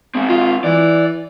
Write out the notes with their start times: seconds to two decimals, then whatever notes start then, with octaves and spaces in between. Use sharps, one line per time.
0.15 G#3 C4
0.29 F4
0.64 E3 D5